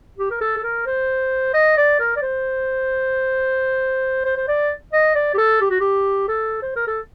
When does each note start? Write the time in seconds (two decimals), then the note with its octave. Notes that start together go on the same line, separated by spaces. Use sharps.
0.18 G4
0.31 A#4
0.41 A4
0.57 A4
0.63 A#4
0.86 C5
1.54 D#5
1.77 D5
2.00 A#4
2.16 D5
2.22 C5
4.25 C5
4.37 C5
4.48 D5
4.93 D#5
5.15 D5
5.34 G4
5.38 A4
5.61 G4
5.70 F#4
5.80 G4
6.28 A4
6.62 C5
6.76 A#4
6.87 A4